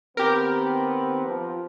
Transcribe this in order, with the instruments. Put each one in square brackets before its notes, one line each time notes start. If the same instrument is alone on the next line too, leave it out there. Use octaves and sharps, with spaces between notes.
[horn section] D#3 B3 C4 [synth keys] G4 A#4
[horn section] F3